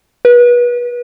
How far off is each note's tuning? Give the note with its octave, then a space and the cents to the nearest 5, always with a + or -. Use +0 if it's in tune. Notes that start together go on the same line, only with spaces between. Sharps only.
B4 -30